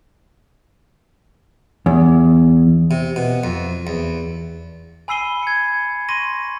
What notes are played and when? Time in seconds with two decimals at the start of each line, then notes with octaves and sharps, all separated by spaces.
1.86 E2
2.91 C3
3.16 B2
3.44 F2
3.87 E2
5.08 G#5 B5 E6 C7 D#7 G7
5.43 G#6 C#7
6.09 C6 C#6 A#6 D#7